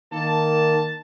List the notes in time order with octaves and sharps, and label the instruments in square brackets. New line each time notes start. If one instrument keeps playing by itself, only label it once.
[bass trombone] D#3 [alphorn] A#3 [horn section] A5